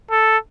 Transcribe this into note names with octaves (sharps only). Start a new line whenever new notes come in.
A4